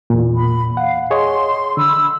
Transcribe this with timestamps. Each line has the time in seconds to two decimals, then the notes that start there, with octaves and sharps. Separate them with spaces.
0.10 E2 A#2
0.34 B5
0.77 F5 F#5
1.11 G#4 C#5 D#5 C6
1.77 D3 B5 E6